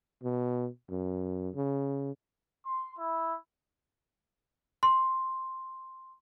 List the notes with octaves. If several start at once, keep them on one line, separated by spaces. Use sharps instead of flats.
B2
F#2
C#3
C6
E4
C6